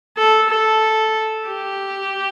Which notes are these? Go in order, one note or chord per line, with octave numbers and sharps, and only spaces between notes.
A4
A4
G4